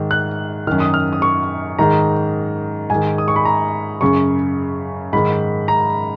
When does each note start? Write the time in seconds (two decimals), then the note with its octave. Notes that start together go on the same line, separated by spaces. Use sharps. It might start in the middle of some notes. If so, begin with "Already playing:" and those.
Already playing: G#2 D#3
0.11 F#6
0.67 F#2 D#3 F6
0.80 D#6
0.94 F6
1.13 D#6
1.22 C#6
1.79 G#2 D#3 A#5
2.90 G#2 D#3 G#5
3.18 D#6
3.28 C#6
3.36 B5
3.45 A#5
4.01 F#2 C#3 C#6
5.13 G#2 D#3 B5
5.68 A#5